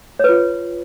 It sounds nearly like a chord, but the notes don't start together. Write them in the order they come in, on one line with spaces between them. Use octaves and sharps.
C#5 B4 F4